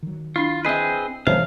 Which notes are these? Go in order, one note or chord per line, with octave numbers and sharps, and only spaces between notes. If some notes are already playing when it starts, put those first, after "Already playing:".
D#3 F#3
D4 E4 F4
C4 G#4 B4 D#5 E5
F1 E3 F#3 G3 C5 C#5 E5 F5